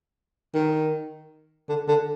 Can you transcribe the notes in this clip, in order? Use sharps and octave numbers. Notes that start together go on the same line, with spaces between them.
D#3
D3
D3